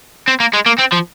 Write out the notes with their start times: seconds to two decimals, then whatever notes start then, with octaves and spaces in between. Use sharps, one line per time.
0.28 C4
0.40 A#3
0.54 G#3
0.66 A#3
0.79 C4
0.93 F3